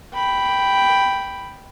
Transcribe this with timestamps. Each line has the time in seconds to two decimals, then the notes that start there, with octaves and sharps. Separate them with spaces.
0.15 G5 B5